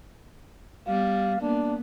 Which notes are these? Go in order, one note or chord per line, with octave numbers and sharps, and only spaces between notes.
G3 B3 F5
A#3 B3 D4